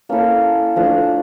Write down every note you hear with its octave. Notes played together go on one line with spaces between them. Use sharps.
A#3 C#4 E4 A4
F3 A3 D4